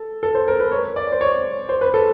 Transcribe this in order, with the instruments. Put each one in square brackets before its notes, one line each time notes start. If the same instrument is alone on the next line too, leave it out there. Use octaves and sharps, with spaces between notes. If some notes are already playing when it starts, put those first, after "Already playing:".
Already playing: [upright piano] A4
A4
C5
A#4
B4
C#5
D5
C5
C#5
C5
B4
A4